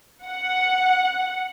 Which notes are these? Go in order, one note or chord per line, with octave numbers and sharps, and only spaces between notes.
F#5